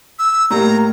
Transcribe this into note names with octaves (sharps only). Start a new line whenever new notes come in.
E6
A2 G3 A#3 A#5